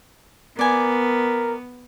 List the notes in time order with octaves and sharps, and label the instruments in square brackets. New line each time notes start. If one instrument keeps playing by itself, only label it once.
[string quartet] B3 [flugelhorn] A#4 [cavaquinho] D5 G#5